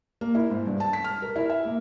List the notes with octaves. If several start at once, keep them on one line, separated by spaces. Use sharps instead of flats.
A#3
E4
G#2
G2
A5
B6
F6
A#4
E4
E5
A#3